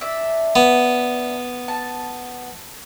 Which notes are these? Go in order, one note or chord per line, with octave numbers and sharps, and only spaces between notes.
D4 E5
B3
A5